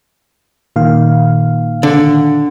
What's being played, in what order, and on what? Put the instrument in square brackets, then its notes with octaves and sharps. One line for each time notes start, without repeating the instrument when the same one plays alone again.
[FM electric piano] A#2 D#3 F5
[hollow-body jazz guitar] D3